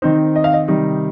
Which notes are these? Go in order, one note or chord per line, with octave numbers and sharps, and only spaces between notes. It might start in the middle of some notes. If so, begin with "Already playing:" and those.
D#3 C4 D#4 C5
D#5
F5
D#5
C3 D#3 G3 D#4